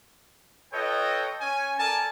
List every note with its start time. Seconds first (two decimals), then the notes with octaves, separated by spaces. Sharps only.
0.73 F4 A4 B4 C#5 D#5 G5
1.41 C#4 G#5
1.78 A4 A#4 D5 G#5 A5